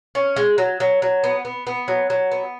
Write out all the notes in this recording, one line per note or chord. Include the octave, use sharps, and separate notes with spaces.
C#4
G#3
F#3
F#3
F#3
B3
B3
B3
F#3
F#3
B3